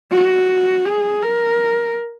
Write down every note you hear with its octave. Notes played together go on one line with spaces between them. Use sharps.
F#4
G#4
A#4